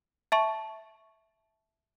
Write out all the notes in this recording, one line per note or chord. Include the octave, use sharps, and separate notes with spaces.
E5 A5 C#6